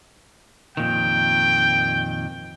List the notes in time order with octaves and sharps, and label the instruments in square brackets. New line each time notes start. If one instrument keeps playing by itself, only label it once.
[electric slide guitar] F2 A#2 D#3 [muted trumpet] G5